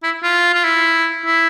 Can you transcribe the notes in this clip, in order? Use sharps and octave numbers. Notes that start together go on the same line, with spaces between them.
E4
F4
F4
E4
E4